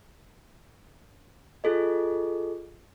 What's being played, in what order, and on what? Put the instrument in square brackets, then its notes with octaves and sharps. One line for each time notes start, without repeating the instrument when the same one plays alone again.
[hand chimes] F4 G#4 A4 D#5